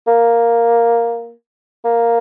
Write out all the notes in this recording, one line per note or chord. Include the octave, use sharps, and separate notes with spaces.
A#3
A#3